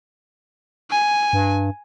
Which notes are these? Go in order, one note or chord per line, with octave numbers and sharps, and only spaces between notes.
G#5
G2